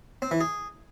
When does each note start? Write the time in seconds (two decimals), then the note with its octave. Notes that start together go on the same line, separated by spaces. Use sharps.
0.22 C4
0.31 E3
0.41 G#4